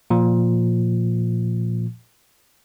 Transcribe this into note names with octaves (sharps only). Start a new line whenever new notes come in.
A#2 F3